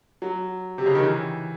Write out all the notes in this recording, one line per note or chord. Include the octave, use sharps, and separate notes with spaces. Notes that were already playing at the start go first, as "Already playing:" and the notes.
F#3
C3
C#3
D#3
E3